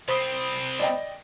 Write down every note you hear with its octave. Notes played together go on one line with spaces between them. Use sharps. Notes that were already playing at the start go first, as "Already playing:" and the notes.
C2 C4 C5 B5 D#6
D5 D#5 G5